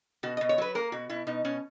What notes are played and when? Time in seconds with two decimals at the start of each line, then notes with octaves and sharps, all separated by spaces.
0.23 B2 F#4
0.37 D#5
0.41 B2
0.49 C#5
0.58 F#3 B4
0.75 A#3 A#4
0.92 B2 F#4
1.09 B2 E4
1.27 B2 D#4
1.45 B2 C#4